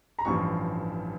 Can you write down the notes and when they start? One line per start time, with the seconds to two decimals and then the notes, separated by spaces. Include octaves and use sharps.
0.19 A#5
0.25 A1 G2 F3 C#6